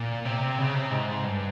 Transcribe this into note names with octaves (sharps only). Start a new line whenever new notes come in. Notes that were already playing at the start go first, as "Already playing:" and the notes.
Already playing: A#2
C3
C#3
C3
G#2
G2